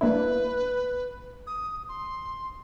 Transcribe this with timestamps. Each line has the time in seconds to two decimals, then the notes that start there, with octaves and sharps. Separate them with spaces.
0.01 A#3 D4 E4 B4
1.47 D#6
1.89 C6